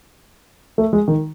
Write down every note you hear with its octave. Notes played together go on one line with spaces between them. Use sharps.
A3
G#3
D#3